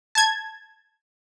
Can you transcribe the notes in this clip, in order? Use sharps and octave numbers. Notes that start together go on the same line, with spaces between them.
A5 G#6